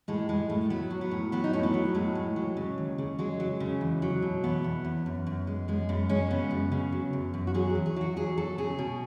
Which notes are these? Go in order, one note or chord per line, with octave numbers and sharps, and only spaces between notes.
A2 G#3
A2 G#3
A2 A3
F#3 B3
F#3
B3
A2
F#3 B3
D#4
A2 C#4
B3
F#3
A2 G#3
A2
F#3
C#3
D#2
C#3
F#3 G#3
F#3
C#3
E2
F#3
B2
E2 B3
E2
E2
F#2
F#2
G#3
F#2 G#3
F#2 B3
G#3 C#4
C#3 B3
F#2
C#3
F#3
F#2
F#2
F#4
F#3 G#4
G#4
E2
G#4
F#3 F#4
E2 G#4
F#3 A4
C#3 G#4
B2